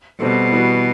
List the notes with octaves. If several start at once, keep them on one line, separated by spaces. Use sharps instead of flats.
B2 G3 C4 F#4 A4
E3 G3 B3 F#4